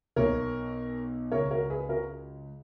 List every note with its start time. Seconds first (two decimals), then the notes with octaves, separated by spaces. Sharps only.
0.16 B1 B2 A#4 C#5
1.32 C#2 C#3 A#4 C#5
1.51 F#4 A#4
1.70 G#4 B4
1.89 F#4 A#4